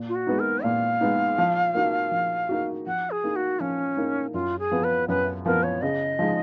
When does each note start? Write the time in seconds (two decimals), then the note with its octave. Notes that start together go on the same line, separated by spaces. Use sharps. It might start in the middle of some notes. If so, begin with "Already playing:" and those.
Already playing: A#2
0.09 F4
0.15 F#4
0.27 G#3 B3 D#4
0.40 A#4
0.63 A#2 F5
1.01 G#3 B3 D#4
1.38 F3
1.75 A#3 D#4 F#4
2.11 F3
2.49 A#3 D#4 F#4
2.87 F3 F#5
3.11 G#4
3.24 A#3 D#4
3.36 F#4
3.60 F3 C#4
3.97 A#3 D#4
4.34 F#2 F4
4.59 G#4
4.71 F3 B3
4.84 B4
5.08 F#2 B4
5.45 F3 B3 A#4
5.63 C#5
5.82 C#3 D#5
6.19 F3 G#3 D#4